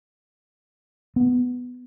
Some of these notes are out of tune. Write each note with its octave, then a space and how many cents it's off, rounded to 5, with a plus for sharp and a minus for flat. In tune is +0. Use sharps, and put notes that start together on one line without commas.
B3 +5